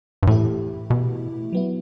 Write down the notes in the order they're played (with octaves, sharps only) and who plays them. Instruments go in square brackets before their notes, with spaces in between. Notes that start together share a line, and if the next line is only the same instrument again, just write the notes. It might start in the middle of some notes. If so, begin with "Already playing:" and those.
[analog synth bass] G2
[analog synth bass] A2 [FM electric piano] E3 A3 E4 G4
[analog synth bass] B2
[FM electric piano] F#3 B3 E4